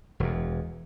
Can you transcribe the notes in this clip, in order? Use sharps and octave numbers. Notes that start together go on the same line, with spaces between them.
E1 E2